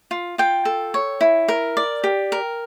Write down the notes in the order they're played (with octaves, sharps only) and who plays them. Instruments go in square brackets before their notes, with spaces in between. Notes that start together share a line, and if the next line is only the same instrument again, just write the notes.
[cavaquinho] F4
F4 G5
A4
C#5
E4
A#4
D5
G4
A#4